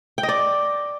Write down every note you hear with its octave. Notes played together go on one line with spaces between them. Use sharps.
G5
D#5
D5